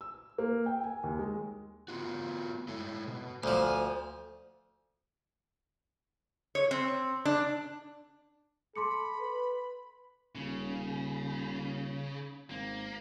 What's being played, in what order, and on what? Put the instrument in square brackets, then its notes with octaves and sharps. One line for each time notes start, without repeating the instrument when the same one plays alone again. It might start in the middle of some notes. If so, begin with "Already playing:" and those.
[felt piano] E6
A#3
G5
G#5
D#2
G#3
[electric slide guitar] B3 F4 F#4
G#3 E4 A4
B2
[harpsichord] D2 F3 [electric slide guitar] G#5
[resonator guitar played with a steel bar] C#5
C4
D4
[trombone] A4 [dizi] B5 [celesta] C6 D6 C#7
[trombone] B4
[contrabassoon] D#1 [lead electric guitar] C#3
[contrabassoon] G#1 [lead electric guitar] A#3